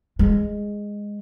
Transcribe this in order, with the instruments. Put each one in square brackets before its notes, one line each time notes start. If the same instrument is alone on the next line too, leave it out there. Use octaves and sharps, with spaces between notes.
[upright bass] G#3